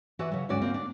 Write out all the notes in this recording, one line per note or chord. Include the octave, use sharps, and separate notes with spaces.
E3 F#4 B4 D5 E5
C#3 F#3
D2 G#2 C#4 F#4 D5
A#3 C4 F4
D4